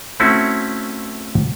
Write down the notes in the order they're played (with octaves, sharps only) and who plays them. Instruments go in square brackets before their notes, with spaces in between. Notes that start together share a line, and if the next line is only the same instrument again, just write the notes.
[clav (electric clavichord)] A3 C4 C#4 E4 F#4